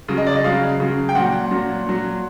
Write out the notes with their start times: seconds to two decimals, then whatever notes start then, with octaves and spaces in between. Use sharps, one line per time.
0.08 C#3 F#3
0.18 D#5
0.27 D5
0.35 D#5
0.44 C#3 F#3 F5
0.80 C#3 F#3
1.09 G5
1.15 A#2 F#3 F#5
1.51 A#2 F#3
1.87 A#2 F#3